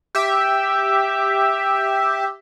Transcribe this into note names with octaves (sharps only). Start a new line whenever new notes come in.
G4 E5